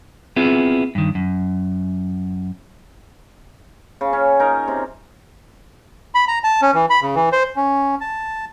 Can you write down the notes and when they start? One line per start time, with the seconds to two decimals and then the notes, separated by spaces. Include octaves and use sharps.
0.36 B3 C4 E4 F4 G#4
0.95 G2 D#3
1.15 F#2
4.01 C#3
4.13 C#4
4.40 D#4 A#4
4.68 C3
6.15 B5
6.28 A#5
6.44 A5
6.62 C#4
6.74 E3
6.90 B5
7.02 C#3
7.15 E3
7.32 C5
7.56 C#4
8.01 A5